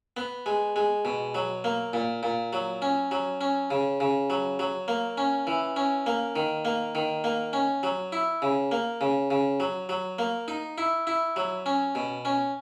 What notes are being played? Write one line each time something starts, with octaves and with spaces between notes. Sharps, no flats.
B3
G#3
G#3
B2
F#3
A#3
A#2
A#2
F#3
C#4
F#3
C#4
C#3
C#3
F#3
F#3
A#3
C#4
E3
C#4
A#3
D#3
A#3
D#3
A#3
C#4
F#3
E4
C#3
A#3
C#3
C#3
F#3
F#3
A#3
D#4
E4
E4
F#3
C#4
B2
C#4